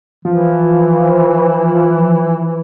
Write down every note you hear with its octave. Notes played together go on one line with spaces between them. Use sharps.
E3 F3